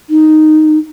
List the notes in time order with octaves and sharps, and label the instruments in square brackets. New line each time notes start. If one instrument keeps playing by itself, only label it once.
[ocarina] D#4